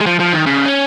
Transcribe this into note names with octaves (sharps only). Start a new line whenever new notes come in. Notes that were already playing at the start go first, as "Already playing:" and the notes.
G#3
F3
F3
D#3
C#3
C#4